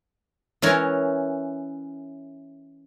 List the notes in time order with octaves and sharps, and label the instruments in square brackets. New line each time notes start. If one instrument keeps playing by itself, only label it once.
[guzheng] E3 C#4 A#4 C#5